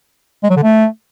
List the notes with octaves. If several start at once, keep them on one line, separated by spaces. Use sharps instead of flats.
G#3
F#3
D3
A3